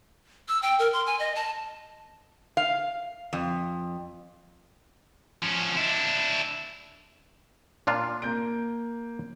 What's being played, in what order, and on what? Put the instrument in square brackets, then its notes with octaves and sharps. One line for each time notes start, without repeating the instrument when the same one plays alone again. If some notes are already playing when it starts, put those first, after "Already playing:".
[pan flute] E6
G5
A#4
C6
G#5
D#5
A5
[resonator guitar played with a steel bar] F5
F2
[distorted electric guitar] F3 C#4
D4 E4
[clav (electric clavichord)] A#2 D4 F4
[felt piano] A#3 G6 D7